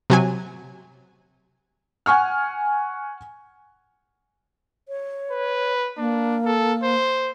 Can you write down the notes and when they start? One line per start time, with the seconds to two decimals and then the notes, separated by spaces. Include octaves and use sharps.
0.10 C3 F#3 G#5
2.06 F#5 G#5 C#6 F6
4.89 C#5
5.31 B4
5.98 A#3 D4
6.45 A4
6.83 C5